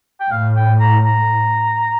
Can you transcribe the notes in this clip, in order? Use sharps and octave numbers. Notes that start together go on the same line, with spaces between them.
G5
A2 F5
G5
A#5
A#5